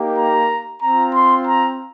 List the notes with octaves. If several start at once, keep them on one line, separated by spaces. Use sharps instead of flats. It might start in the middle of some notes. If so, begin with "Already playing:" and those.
Already playing: A#3 D#4 G4
A#5
C4 F4 A#5
C6
A#5